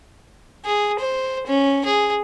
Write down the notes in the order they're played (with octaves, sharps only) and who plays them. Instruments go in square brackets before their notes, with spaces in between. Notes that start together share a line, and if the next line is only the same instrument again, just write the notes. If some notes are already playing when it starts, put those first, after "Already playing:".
[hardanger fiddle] G#4
C5
C#4
G#4